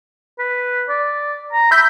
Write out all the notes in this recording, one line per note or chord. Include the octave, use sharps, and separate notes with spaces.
B4
D5
A#5
E5 B5 G6 B6